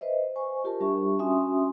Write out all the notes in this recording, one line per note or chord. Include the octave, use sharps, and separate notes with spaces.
B4 C5 D#5 E5
C5 G#5 C#6
F4 G4 A#4 A5
G3 D4 G4 E5 C#6
C#4 F#4 E5 G#5 C6 D#6